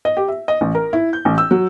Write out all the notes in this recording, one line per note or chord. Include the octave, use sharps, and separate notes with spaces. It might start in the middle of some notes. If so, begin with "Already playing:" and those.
D#5
G4
E5
D#5
A1
A#4
E4
G6
A1
E6
F#3